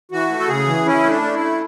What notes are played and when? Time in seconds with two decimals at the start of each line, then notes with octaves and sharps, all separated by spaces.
0.12 E3 F#4
0.30 A3
0.40 A4
0.48 C#3 G#4
0.67 E3
0.85 C#4 E4
1.04 A3
1.09 D4
1.22 A3
1.34 E4
1.40 A3